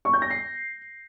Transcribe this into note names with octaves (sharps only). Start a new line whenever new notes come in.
C#6
G6
A#6
C7